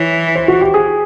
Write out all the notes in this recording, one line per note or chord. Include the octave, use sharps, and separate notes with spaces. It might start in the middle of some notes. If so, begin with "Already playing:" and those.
Already playing: E3 C#5
C5
F#4
G4
G#4